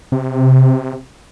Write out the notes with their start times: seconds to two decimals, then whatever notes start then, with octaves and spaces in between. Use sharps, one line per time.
0.12 C3